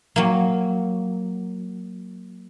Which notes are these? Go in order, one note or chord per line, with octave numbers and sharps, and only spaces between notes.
F#3 A#3